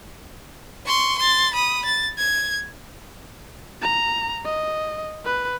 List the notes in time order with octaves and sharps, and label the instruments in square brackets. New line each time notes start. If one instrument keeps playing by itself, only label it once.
[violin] C6 C#6
C6 A6
B5 D#6
A6
G#6
[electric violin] A#5
D#5
B4